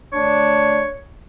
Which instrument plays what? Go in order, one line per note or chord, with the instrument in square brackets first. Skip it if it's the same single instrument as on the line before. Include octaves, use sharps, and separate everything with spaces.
[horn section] D3 A3 D4 [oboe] C#5